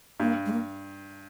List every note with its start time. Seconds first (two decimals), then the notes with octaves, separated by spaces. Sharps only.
0.20 G2 A#3
0.46 G#3
0.52 A#3